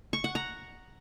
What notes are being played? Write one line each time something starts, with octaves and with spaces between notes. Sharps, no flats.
C#6
F#5
A#5